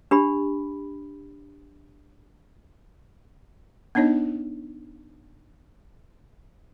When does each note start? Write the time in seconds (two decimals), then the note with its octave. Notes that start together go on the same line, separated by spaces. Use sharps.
0.11 D4 G4 B5
3.95 B3 D4 D#4 C#5 D#5